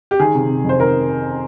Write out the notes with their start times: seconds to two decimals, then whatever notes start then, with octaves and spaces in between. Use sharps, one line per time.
0.11 G4
0.20 D#3 G#4
0.35 C3
0.50 C3
0.64 F2 C5
0.80 D#3 A#4